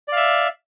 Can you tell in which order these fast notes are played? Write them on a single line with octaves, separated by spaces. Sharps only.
D5 F5 E5